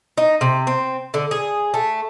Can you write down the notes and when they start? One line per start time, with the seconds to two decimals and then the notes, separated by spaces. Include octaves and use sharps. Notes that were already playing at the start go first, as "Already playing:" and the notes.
0.17 D#4
0.41 C3
0.67 C4
1.14 D3
1.31 G#4
1.74 A3